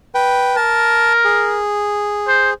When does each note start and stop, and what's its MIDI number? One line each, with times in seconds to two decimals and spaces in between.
0.15 0.56 71
0.15 0.56 79
0.56 1.62 70
0.56 1.13 81
1.24 2.54 68
2.28 2.51 72